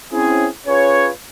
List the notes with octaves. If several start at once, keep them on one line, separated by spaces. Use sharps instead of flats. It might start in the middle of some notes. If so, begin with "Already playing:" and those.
C4 C#4 E4 G#4
C#4 F4 G#4 B4 C#5